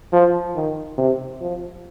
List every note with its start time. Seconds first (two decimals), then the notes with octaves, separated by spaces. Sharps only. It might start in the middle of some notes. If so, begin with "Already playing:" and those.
0.12 F3
0.55 D#3
0.98 C3
1.41 F3